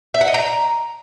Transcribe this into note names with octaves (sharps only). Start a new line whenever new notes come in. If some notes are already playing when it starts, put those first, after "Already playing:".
E5
F#5
D#5
A#5